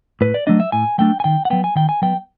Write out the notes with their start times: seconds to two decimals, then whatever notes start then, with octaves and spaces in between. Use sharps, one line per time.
0.21 A2 B4
0.34 D5
0.47 F#3 A3 D4 D#5
0.60 E5
0.72 A2 G#5
0.98 F#3 A3 D4 G5
1.20 G#5
1.24 D#3 G5
1.45 F#5
1.50 F#3 B3 G5
1.64 G#5
1.76 D#3 G5
1.89 G#5
2.02 F#3 B3 G5